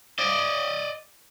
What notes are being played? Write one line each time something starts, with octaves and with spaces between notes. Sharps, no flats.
D5 D#5